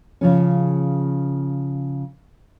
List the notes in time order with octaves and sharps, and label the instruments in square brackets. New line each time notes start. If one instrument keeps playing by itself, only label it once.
[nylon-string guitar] C#3 F3 C#4